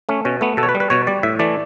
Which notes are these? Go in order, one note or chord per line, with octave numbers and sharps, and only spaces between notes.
A3 C#4
B2 C#4
A3 B3
B2 A4
C#5
B4
G3
B4
B2 C#5
G3 D5
A2 E5
E3 A3 D5